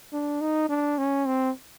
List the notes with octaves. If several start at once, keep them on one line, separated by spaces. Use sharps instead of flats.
D4
D#4
D4
C#4
C4